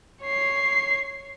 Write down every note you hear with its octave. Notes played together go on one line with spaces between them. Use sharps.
C#5 C7